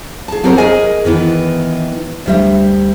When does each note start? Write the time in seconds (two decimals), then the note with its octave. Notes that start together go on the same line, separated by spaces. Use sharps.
0.28 G#4 A5
0.43 B3 C4 G4 A#4 C5 C#5
0.58 G#4 A#4 D#5 G#5
1.05 D#3 E3 B3
2.26 D2 G3 E5